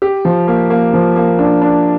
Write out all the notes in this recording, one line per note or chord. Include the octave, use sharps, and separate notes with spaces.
G4
F3
A#3
A#3
F3
A#3
D4
D4